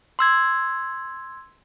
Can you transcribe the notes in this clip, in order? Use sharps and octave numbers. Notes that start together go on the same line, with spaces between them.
C6 E6 G#6